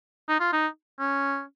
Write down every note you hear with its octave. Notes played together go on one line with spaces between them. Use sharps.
D#4
F4
D#4
C#4